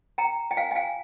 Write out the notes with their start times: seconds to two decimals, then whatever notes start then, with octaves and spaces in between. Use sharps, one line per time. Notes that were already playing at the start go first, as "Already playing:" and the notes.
0.18 G5 A#5
0.51 G5
0.57 F5 G#5
0.71 G5
0.76 F5 G#5